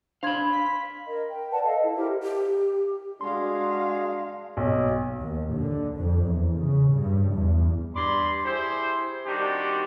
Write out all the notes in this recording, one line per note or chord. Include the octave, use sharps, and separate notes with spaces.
D4 C5 F5 B5 C6 G#6
B6
A#4 D#5
G5
B4 D5 F#5 A5
A4 D#5 F5
E4
G4 A#4 C5 E5
G4
G#3 D4 F#4 G#4 F5 C6
B1
D#2
D3
F2
E2
C#3
G2
E2
G2 D5 B5 C6
E4 G4 G#4 C5
D#3 G3 C4 D4 F#4 G4